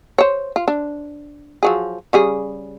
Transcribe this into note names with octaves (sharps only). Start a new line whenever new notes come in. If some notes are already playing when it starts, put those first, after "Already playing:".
C5 C#5
F4
D4
F3 F#3 G#4
C#3 G3 G#4